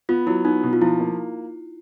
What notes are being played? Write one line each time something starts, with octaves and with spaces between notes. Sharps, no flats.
B3 F4
F#3 E4
B3 D#4
B2
F4
F3 E4
A#3